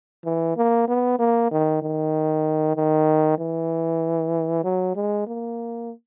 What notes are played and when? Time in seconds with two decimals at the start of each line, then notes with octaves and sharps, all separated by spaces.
0.25 E3
0.57 A#3
0.88 B3
1.19 A#3
1.51 D#3
1.82 D#3
2.77 D#3
3.38 E3
4.64 F#3
4.96 G#3
5.27 A#3